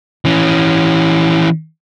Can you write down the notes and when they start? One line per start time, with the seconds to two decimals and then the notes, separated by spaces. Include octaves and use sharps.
0.25 E3 C#4